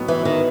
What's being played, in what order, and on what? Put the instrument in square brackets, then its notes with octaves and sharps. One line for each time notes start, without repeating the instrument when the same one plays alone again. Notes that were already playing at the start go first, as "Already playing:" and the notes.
Already playing: [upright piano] A2 F#3 B3 D#4
[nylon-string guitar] E3
D#3